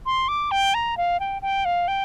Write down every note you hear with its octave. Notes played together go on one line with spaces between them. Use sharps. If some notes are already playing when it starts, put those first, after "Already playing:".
C6
D6
G5
A#5
F5
G5
G5
F5
G5